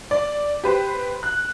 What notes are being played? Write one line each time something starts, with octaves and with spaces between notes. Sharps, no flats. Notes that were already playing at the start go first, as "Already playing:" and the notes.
D5
G4 B4 C5
F#6